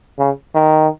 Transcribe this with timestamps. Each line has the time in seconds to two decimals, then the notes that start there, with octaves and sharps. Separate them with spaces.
0.19 C#3
0.55 D#3